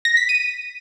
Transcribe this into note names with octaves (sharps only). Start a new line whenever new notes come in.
A#6
B6
D#7